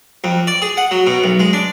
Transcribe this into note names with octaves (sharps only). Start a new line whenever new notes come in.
F2
D5
G#4
F#5
F#3
B2
B1
G#3
D4